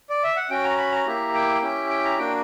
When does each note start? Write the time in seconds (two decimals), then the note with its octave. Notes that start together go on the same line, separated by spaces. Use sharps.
0.10 D5
0.23 E5
0.37 F#5
0.50 C#4 F#4 G5
0.64 A#5
0.77 B5
0.92 A#5
1.06 A#3 E4 G4
1.34 G5
1.62 C#4 E4 G4
1.90 G5
2.04 A#5
2.18 A#3 D4 F#4 G5